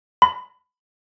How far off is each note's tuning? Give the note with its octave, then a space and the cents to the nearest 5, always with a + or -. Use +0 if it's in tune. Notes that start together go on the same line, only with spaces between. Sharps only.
B5 +25